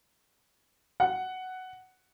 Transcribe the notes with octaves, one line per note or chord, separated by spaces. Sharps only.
F#5